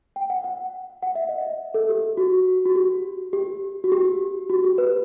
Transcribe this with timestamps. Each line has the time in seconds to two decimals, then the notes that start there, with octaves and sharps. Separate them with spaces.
0.16 G5
0.30 F#5
0.44 F#5
1.03 F#5
1.15 E5
1.29 D#5
1.41 E5
1.74 A4
1.89 G4
2.17 F#4
2.65 F#4
2.76 G4
3.33 G4
3.84 F#4
3.92 G4
4.50 F#4
4.64 G4
4.78 B4